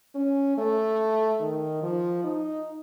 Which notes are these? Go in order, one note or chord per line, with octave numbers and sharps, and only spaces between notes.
C#4
A3
D#3
F3
D#4